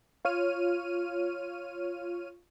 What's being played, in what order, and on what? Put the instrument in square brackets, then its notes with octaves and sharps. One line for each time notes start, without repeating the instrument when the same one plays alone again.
[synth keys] F4 C#5 F6 D#7